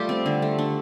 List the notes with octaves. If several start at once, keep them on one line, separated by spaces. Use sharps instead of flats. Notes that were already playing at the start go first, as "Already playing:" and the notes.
Already playing: G3 A3 F4 G4
C4
D3
A3
D4